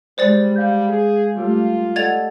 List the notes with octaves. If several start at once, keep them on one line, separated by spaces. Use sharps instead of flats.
G3 G#3 C5 D5 F#6 A6
G3 F5 G6
G#4
G3 A3 F4 G4
A4 D5 D#5 F#5 G#6 A6 F7